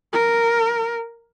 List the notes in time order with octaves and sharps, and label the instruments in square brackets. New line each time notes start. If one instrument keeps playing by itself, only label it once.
[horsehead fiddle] A#4